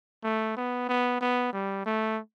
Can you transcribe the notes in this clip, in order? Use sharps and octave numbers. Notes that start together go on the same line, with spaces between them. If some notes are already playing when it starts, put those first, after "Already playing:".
A3
B3
B3
B3
G3
A3